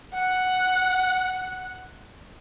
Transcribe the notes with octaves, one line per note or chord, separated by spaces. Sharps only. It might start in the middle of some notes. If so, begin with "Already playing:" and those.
F#5